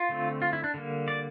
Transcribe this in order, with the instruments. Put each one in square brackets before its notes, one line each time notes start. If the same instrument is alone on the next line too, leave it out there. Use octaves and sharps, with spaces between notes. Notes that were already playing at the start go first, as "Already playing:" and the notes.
Already playing: [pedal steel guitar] F4
D3 A3 C4
F4
E4
D4
D3 G3 A#3
D5